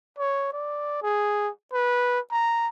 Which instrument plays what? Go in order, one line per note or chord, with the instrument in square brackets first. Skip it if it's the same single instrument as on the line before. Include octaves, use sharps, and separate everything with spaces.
[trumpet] C#5
D5
G#4
B4
A#5